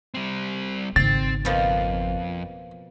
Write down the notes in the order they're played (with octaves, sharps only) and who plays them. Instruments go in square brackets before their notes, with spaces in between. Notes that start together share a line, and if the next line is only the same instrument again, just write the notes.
[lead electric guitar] G3 C4
[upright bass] G#1 C#3 [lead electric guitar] C4 [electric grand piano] A6
[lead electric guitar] F2 [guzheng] B2 F3 A#3